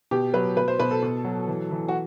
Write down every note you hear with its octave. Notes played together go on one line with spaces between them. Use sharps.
B2 G4
F#3 B4
B2 B4
C5
B2 B4
A4
B2
F#3
E3
E3
F#4